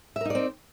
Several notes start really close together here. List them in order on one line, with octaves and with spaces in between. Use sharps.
E5 A#4 D#4 D5 C4